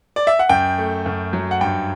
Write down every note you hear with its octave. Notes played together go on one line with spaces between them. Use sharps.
D5
E5
F#5
F#2 G5
A3
F#2
F#3
F#5
G2 G5